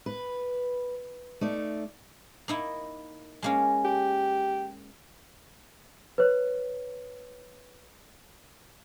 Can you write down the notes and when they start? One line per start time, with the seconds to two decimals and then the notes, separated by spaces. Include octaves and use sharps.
0.06 B4
1.41 A3 D#4 D5
2.48 A#3 D#4 E4
3.43 G#3 A#3 C#4
3.85 G4
6.18 B4 C#5